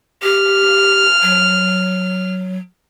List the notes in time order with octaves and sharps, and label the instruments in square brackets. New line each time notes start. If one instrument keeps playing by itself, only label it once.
[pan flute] G4 [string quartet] F6
[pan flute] F#3